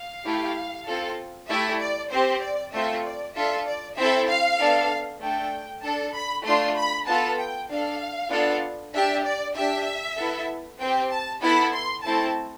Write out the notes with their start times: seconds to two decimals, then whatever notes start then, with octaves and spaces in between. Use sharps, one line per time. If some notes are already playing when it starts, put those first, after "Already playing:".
Already playing: F5
0.25 A3 E4 G4
0.86 C4 F4 A4
1.49 A3 E4 G4 E5
1.80 D5
2.11 C4 G4 C5
2.42 D5
2.73 A3 C4 F4 A4 E5
3.04 D5
3.35 D4 F4 A4 E5
3.65 D5
3.97 C4 E4 A4 E5
4.28 F5
4.59 B3 D4 A4
5.21 A3 D4 A4 G5
5.83 D4 A4 A5
6.14 B5
6.45 A3 D4 F4 C6
6.76 B5
7.07 B3 F4 A4 A5
7.38 G5
7.69 D4 A4 F5
8.31 B3 D4 F4 A4
8.93 D4 G4 E5
9.24 D5
9.55 D4 G4 E5
10.17 B3 E4 A4
10.79 C4 G4 G5
11.10 A5
11.42 B3 E4 A4 B5
11.73 C6
12.03 A3 C4 E4 A4 A5